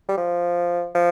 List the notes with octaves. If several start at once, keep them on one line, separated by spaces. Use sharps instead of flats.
G3
F3
F3